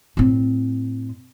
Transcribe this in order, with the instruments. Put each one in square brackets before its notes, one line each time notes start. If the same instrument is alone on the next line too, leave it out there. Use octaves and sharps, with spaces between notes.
[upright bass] A2 C4